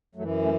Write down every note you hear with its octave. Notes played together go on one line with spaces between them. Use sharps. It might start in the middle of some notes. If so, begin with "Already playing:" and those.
F#2 E3 F#3 A3
A3 C#4